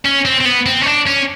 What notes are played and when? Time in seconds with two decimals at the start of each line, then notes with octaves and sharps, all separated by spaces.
0.05 C#4
0.25 C4
0.40 C4
0.45 B3
0.66 C4
0.81 C#4
0.86 D4
1.07 C#4